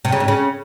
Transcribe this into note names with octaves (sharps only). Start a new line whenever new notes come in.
C3
C#3
G#2
C#3